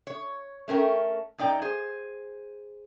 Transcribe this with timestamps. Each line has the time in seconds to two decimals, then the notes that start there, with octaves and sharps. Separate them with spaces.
0.07 C#5
0.68 A3 C#4 A#4 G5
1.38 F#2 D#4 D5 G5 A#5
1.62 G#4 C5